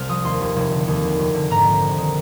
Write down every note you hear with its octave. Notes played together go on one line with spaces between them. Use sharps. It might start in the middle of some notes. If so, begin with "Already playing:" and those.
Already playing: C2 C3 F6
F3 D#6
D#2 C6
F1
F1
D3
D#2
F1
F1
D3
G#2 A#5
A#1
A#1
D#3